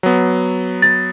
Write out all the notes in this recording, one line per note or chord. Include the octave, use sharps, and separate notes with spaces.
F#3 B3
A6